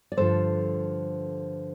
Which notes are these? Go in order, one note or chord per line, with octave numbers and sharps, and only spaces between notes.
D5
G2 D3 F3 A4 C5